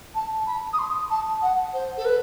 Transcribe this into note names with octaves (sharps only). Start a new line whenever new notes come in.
A5
A5
B5
D#6
C6
A5
F#5
C5
A4
B4